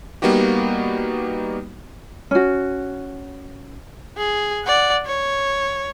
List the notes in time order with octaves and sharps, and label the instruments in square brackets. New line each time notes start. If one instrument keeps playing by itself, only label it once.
[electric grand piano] G3 A#3 B3 D#4 F#4 G4
[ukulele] C#4 F#4
[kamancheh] G#4
D5 F#5
C#5